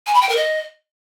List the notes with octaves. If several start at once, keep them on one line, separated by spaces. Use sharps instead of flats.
G#5
B5
G5
A#4
D#5